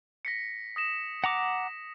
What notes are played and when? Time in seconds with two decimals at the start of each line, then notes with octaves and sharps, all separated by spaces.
0.25 A#6 B6 C#7
0.76 D#6 A#6 E7
1.24 F#5 A#5 D6 A#6